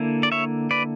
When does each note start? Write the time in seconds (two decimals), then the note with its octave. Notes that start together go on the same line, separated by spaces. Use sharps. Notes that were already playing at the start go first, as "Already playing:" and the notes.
Already playing: D3 A#3 E4
0.23 D5
0.32 C#5 E5
0.71 B4 D5